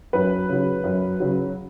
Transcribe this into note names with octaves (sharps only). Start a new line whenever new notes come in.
F#2 B4
C#3 F#3
F#2
C#3 F#3